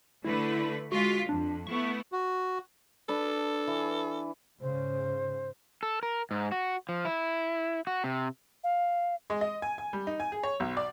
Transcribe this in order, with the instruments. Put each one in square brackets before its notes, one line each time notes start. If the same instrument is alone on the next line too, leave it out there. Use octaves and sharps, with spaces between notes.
[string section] D3 A3 B4 [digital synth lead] E4
[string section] G#3 F4 B6 [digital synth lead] F#4
[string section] F2 [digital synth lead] D4
[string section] A3 B3 E4 [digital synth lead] C#6
[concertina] F#4
[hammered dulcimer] D4 B4 [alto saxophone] A4
[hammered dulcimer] E3
[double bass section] G#2 C#3 [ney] C5
[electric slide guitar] A4
A#4
G#2
F#4
F3
E4
F#4
C3
[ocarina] F5
[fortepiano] G#3
D#5
G#5
G#5
G3
D#4
G#5
G#4
C#5
B1
D5